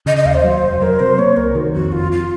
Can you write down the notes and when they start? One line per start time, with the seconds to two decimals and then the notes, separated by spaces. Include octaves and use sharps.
0.06 C#3 D#5
0.17 D#5
0.25 D#2 F5
0.34 C5
0.44 F#3
0.62 F1
0.81 F#3 A#4
1.00 C3 C5
1.18 A#3 C#5
1.37 C2 A#4
1.55 D#3 F#4
1.74 F2 F#4
1.92 F#1 F4
2.12 F4